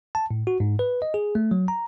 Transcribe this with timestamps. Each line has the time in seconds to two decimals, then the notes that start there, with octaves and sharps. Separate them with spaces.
0.15 A5
0.31 A2
0.47 F#4
0.60 G#2
0.79 B4
1.02 D#5
1.14 G#4
1.35 A3
1.51 F#3
1.68 A#5